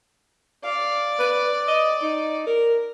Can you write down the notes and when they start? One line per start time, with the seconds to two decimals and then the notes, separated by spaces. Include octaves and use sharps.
0.64 D5 F5
1.19 B4
1.68 D#5
2.02 D#4
2.47 A#4